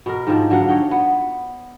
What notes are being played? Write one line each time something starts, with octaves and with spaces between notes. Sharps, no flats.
B2 A#4
G#2 D#3 F3 D4
D3 F#3 F5 F#5
C#5 D#5 G5
B3